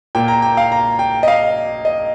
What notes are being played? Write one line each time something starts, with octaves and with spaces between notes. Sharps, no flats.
A#2 A#3 G5
A#5
G5
F5
A#5
G5
D#5
F5
D#5